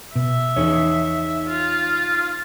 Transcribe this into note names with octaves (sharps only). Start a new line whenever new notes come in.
B2 E5
E2 D#4 G#4 C#5
F4